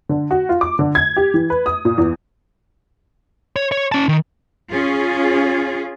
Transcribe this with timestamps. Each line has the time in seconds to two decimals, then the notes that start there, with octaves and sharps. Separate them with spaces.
0.09 D3
0.31 F#4
0.49 F4
0.61 D6
0.79 D3
0.95 G#6
1.17 G4
1.34 E3
1.50 B4
1.66 D#6
1.85 A#2
1.98 E2
3.56 C#5
3.72 C#5
3.92 C#4 A5
4.09 D#3
4.72 C#4 F4 G#4